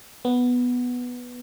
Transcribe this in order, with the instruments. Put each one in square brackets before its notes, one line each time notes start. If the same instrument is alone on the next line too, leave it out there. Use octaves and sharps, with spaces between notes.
[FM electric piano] B3